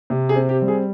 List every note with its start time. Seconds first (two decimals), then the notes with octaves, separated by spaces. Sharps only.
0.10 C3
0.29 G#4
0.36 C4
0.49 G4
0.62 G3
0.68 G#4